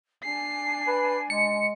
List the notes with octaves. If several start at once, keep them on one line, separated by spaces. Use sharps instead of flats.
D4 G#5 C7
B4
G#3 C#7